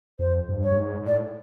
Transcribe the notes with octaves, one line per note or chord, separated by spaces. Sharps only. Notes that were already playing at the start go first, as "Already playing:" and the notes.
F2 C5
G2
C#5
G2
G#2
G#2
A2 D5